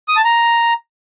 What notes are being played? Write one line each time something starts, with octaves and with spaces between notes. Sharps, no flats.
D#6
A5
A#5